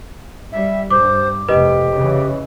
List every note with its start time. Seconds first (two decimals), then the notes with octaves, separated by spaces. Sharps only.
0.52 G3 E5
0.90 G2 C5 D6
1.49 F1 G4 B4 D#5
1.94 C#3 E3